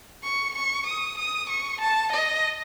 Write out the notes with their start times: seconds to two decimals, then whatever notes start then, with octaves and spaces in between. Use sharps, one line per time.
0.23 C#6
0.55 C#6
0.86 D#6
1.18 D#6
1.49 C#6
1.81 A5
2.12 D#5